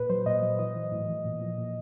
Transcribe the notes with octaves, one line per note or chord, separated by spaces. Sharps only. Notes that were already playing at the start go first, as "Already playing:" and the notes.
Already playing: A#2 B4
F#3 C5
A#2 D#5
F#3
E3 D#5
E3
A2
E3
A#2
F3
A#2